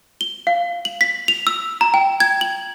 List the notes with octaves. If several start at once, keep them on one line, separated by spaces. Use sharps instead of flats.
G7
F5
F#7
B6
F7
E6
A#5
G5
G#6
F#7